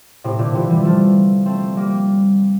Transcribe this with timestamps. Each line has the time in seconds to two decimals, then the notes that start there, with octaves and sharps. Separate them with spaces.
0.24 A2 C3
0.39 A#2 D3
0.55 C3 E3
0.69 E3 G3
0.85 F3 A3
1.46 A3 C4
1.76 G3 A#3